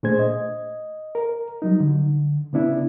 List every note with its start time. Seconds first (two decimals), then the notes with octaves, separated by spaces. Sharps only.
0.03 A#2 A3 D4 G#4 C5 G#6
0.19 D#5
1.15 A#4
1.62 F#3 G3 D#4
1.80 D3
2.53 C#3 B3 D4 E4